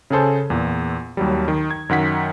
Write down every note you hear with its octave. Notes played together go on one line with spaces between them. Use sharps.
C#3 C#4 G#4 A4 C5
E2 A#2
D#2 F#3 G3
D#3
G#6
F#2 D#3 F#5 B6